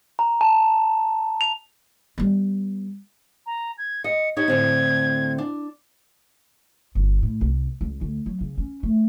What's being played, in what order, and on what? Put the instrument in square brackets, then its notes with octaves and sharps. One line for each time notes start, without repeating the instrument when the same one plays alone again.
[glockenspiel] A#5
A5
F7
[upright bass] G3 B3
[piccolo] A#5
G#6
[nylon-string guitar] D#5 [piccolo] C#7
[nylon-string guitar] D#4 G4 C#5 [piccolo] G#6
[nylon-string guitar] A2 D3 C4
D4
[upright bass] G1
A2
C2
C#2
D2
F#3
C#3
C#4
A3